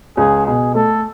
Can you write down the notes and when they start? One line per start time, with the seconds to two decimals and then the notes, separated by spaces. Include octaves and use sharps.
0.17 C#2 G#4
0.46 B2 G#4
0.75 A3 A4